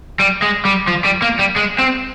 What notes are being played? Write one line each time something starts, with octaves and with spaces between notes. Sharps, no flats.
G3
G#3
G3
F3
G3
A#3
G3
G#3
C4